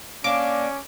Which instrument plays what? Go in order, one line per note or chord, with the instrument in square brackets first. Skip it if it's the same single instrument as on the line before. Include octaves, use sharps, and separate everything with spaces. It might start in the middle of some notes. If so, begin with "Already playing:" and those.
[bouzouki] A#3 D4 [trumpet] C#4 [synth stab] D6